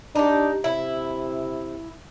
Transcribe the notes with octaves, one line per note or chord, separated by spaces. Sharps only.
D4 D#4 G4
C3 E4